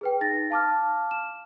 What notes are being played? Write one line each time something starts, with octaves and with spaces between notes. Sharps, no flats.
G#4 B4 G5
D#4 A6 A#6
F5 A5 D6 F6
E7